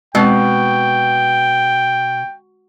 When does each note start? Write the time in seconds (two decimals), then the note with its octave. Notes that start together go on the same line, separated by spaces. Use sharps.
0.15 B2 G#3 C4 G5